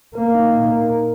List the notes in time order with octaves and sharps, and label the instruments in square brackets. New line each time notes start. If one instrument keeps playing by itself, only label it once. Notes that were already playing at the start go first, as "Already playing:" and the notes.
[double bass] A#3 [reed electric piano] A#4
[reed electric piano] D#4
A#2
A#4
A#4